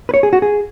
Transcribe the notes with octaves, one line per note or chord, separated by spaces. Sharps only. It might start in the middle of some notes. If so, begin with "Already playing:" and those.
B4
C#5
G#4
F#4
G#4